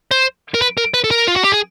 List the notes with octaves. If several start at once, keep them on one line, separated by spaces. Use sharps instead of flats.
C5
A#4
B4
A#4
B4
A4
A#4
F4
F#4
G4
G#4